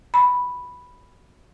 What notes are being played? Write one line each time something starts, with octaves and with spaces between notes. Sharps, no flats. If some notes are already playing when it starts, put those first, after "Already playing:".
B5